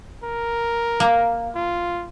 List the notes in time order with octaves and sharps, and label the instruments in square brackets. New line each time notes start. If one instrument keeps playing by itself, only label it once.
[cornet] A#4
[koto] A#3
[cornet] F4